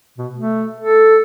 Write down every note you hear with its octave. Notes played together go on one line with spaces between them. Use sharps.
B2
A3
A4